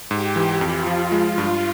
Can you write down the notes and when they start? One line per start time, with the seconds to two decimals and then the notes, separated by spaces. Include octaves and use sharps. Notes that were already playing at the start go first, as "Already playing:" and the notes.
0.11 G#2 G4
0.36 E3
0.61 F2 F4
0.87 F3
1.12 G#3
1.38 G2